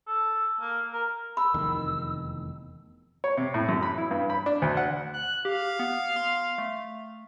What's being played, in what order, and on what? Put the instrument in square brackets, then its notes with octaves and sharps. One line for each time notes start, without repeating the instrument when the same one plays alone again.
[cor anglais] A4
A#3
A#4
[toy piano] B5 [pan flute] E6
[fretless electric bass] F1 E2 D#3
[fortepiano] C#5
C3
A2
F#2
B5
E4
G2
B5
D4
D2
F#5
[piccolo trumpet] F#6
[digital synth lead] G4 [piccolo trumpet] F5
[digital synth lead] B3
C6
A3